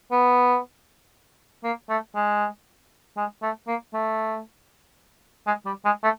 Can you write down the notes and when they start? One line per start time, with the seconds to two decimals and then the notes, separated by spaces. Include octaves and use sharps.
0.11 B3
1.64 A#3
1.89 A3
2.15 G#3
3.17 G#3
3.42 A3
3.67 A#3
3.94 A3
5.47 G#3
5.66 G3
5.85 G#3
6.04 A3